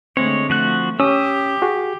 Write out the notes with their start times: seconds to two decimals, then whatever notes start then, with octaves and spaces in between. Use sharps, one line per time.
0.17 D3 G#3 A3 C4 C#5
0.50 F3 A3 F#4 F#6
1.00 C#4 G4 D#6 E6
1.62 F#4 G#4